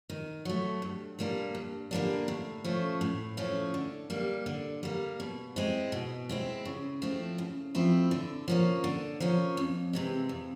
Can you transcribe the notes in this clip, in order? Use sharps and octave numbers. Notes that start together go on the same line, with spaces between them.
D#3
F#3 A3
G2
D3 G3 A#3 D4
G2
D3 G3 A#3 D4
A2
F3 A3 C#4
A2
F3 A3 C#4
D3
G3 A#3
D3
G3 A#3
B2
G#3 C4 E4
B2
G#3 C4 E4
C#3
F3 A3 C4 E4
C#3
F3 A3 C4 E4
D3
F3 A#3 C#4
D3
F3 A#3 C#4
F2
C3 E3 G#3
F2